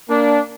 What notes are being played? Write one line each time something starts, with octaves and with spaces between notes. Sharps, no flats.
A#3 D4